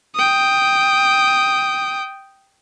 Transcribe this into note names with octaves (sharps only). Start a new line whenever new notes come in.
G5 D#6